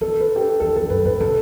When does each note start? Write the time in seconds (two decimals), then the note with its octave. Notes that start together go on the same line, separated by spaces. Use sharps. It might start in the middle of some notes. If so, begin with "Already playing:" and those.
0.01 E2 A4
0.20 B4
0.36 G4
0.41 A4
0.60 E2 A4
0.76 E2 A4
0.90 F#2 B4
1.05 A2 B4
1.20 C3 A4